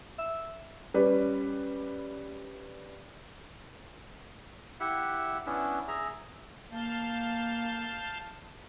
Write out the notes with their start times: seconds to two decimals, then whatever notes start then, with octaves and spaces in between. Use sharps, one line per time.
0.18 E5
0.94 G3 C#4 B4 D5
4.80 E4 G4 E5 F#5
5.46 B3 C#4 D4 E4
5.88 G#4 E5 A#5
6.71 A#3 F5 A5 G6